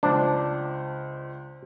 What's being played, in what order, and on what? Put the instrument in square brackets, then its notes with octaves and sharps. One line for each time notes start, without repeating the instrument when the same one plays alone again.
[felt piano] C#2 C5 [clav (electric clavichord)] D4